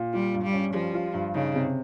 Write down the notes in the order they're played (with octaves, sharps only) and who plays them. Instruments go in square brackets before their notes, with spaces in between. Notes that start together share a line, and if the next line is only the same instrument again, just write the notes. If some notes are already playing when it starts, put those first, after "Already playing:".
Already playing: [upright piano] A#2
[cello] G3 [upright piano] F4
[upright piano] G2
[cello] G3
[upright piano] C#4
[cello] F3 [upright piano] G3
[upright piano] F4
G2
[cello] C#3 [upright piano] D#4
[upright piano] C3